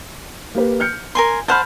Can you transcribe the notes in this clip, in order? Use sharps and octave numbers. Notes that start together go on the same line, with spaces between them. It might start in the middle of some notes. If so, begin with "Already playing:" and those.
A#3 G4 B4
F6 G6 C#7
A#4 G#5 C6
C5 F#5 A5 B5 F6 G6